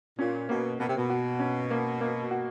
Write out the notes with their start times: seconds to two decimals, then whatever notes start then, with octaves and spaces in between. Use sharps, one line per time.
0.19 A#2 C#4
0.49 B2 A#3
0.79 B2 A#3
0.88 C3
0.97 B2
1.09 F#4
1.39 C#4
1.71 A#3
2.01 A#3
2.31 F#4